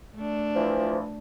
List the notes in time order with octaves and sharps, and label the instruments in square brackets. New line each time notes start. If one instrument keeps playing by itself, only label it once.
[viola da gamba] A3 D4
[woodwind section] E3 F3